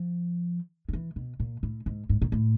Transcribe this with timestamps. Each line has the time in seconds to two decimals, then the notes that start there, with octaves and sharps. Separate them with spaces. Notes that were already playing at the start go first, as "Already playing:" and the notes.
Already playing: F3
0.89 D#3
0.93 E3
1.16 B2
1.40 A#2
1.63 A2
1.86 G#2
2.09 G#2
2.22 A#2
2.32 A2